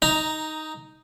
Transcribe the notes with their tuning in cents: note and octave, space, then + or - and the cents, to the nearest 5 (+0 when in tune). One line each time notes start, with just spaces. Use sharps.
D#4 +5 A#5 -5